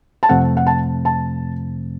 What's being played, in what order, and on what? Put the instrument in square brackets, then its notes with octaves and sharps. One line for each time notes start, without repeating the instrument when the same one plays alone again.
[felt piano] A5
[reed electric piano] F2 C3 F3 A3 C4 [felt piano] F#5
[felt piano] F#5
A5
A5